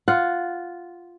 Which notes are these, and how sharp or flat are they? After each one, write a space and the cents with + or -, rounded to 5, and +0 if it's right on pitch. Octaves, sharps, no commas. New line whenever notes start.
F4 +0 F#5 +0